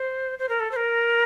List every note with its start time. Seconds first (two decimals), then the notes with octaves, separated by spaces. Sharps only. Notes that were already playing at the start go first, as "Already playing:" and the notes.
Already playing: C5
0.39 C5
0.49 A#4
0.60 A4
0.71 C5
0.76 A#4